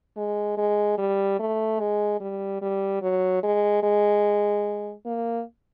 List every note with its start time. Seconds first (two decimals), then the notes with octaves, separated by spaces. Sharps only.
0.17 G#3
0.58 G#3
0.98 G3
1.40 A3
1.80 G#3
2.21 G3
2.62 G3
3.02 F#3
3.43 G#3
3.83 G#3
5.06 A#3